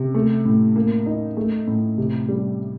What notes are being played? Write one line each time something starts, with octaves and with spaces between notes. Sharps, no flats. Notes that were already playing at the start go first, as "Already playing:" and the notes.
Already playing: C3
A3
A2
A#3
D#4
A3
A2
C3
G3